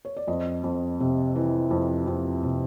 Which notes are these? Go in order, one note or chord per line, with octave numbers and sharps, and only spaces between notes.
C#5
D5
F2 D#5
F2
C3
E3
F2
F2
C3